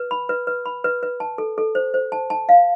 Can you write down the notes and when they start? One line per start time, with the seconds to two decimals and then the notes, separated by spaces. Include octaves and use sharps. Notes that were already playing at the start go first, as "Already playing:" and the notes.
Already playing: B4
0.11 B5
0.29 B4
0.47 B4
0.66 B5
0.84 B4
1.03 B4
1.20 A5
1.38 A4
1.58 A4
1.75 C5
1.94 C5
2.12 A5
2.30 A5
2.49 F5